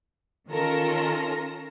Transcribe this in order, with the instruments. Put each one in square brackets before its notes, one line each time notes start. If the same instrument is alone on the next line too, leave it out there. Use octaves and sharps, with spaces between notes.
[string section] D#3 C#4 F4 A4 A#4 A#6